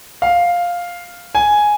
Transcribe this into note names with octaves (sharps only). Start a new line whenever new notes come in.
F5
G#5